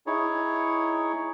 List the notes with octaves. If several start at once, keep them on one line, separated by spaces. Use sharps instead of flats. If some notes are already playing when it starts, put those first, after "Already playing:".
D#4 E4 G#4 C#5